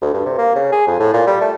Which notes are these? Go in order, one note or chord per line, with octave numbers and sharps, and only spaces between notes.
D2
G2
C3
A#3
C#3
G#4
F2
A2
A#2
G3
A3